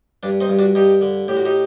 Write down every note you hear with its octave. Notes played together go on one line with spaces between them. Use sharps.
G2 D4
C4 D#4
G2
D4 F#4
G2 D#4 G4
D3
A2 G4
F#4
D#4 G4